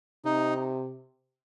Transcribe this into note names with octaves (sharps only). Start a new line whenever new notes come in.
C3 D#4